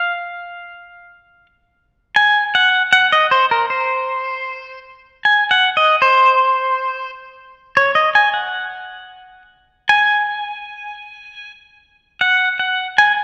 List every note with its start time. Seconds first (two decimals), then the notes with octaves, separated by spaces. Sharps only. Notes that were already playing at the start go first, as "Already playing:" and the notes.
Already playing: F5
2.16 G#5
2.55 F#5
2.93 F#5
3.12 D#5
3.31 C5
3.51 A#4
3.70 C5
5.25 G#5
5.51 F#5
5.77 D#5
6.02 C5
7.77 C#5
7.95 D#5
8.15 G#5
8.34 F#5
9.89 G#5
12.21 F#5
12.59 F#5
12.98 G#5